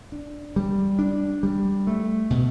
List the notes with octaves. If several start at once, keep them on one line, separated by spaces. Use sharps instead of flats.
D4
G3
D4
G3
A3
B2